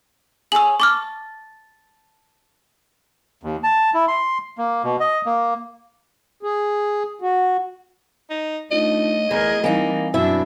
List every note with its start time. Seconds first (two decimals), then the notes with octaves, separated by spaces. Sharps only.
0.52 G#4 C#5 E6 F#7
0.80 A5 C#6 D6 F6
3.43 D#2
3.63 A5
3.94 E4
4.08 C6
4.58 A#3
4.84 B2
5.00 D#5
5.26 A#3
6.43 G#4
7.22 F#4
8.30 D#4
8.71 A3 D4 D#4 F4 D#5
9.31 E2 A3 G#4 A#4
9.64 E3 G3 A#3 C4 D#4 G#5 A#6
10.14 F#2 B2 D4 E4 E5